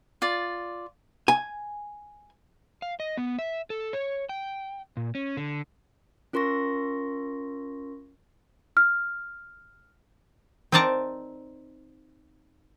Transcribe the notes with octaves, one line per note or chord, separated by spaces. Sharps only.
F4 D5
G#5
F5
D#5
B3
E5
A4
C#5
G5
A#2
C#4
D3
C#4 F4 A#4 C6 C#6 A#6
F6
C4 D#4 A#4 D5 A5 A#5